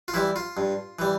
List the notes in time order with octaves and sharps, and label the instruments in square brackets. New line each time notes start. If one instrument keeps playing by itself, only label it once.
[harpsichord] F4
E3 G3 E4
F4
G2
E3 G3